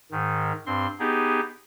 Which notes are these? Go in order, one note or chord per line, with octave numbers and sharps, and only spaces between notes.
G#2 D#3
G2 C4 C6
B3 D#4 G4 G#4